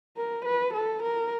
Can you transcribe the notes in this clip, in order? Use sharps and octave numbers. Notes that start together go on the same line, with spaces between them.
A#4
B4
A4
A#4